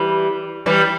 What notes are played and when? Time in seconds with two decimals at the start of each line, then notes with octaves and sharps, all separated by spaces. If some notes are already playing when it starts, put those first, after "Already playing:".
Already playing: E3 G3
0.66 E3 G3